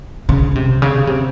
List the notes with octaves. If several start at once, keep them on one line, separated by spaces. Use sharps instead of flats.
C#3
C3
C#3
C3